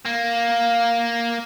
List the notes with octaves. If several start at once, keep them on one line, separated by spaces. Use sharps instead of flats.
A#3